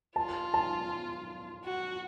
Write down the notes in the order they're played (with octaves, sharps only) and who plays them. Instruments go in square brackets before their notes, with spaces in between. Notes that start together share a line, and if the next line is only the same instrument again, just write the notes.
[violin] F4 [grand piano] A5
[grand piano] A5
[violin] F#4